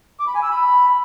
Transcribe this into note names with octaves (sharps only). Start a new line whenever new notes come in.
D6
B5
G#5
E6
B5